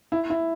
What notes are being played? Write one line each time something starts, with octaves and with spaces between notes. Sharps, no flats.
E4
E4